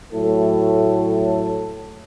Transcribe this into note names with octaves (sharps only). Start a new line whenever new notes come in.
A2 F#3 A3 A4